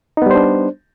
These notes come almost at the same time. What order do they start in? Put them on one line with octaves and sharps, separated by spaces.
D#4 B3 G3 C5 D4